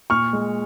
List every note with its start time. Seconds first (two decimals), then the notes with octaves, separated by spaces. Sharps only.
0.10 A#2 C#6 F6
0.33 G#3